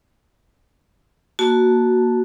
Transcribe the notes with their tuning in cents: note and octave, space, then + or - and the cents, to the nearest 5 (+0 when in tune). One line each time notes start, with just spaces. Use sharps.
A#3 +10 F#4 +0 A5 +0